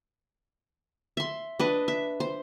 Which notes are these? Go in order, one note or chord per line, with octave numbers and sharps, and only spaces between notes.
E5 C6
D4 B4 D#5
E5
C5